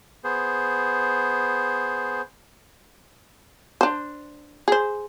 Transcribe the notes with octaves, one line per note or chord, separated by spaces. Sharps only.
B3 G#4 C5
D4 C5
G#4 C5